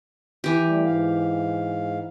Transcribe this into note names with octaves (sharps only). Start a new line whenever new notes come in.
E3 G4
G3 A3
G#2 F5